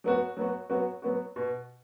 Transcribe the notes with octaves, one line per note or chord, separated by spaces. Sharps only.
F#3 B3 F#4
F#3 B3 F#4
F#3 B3 F#4
F#3 B3 F#4
B2